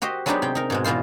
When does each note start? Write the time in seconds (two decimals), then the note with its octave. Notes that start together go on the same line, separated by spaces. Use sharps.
0.02 F#4 G4 C5 D#5
0.26 F#3 G#3 B3 D4 D#4 G4
0.42 C3 G5
0.55 D#4 A#4
0.70 G#2 B2 G#3
0.84 E2 B2 E3 F4 C5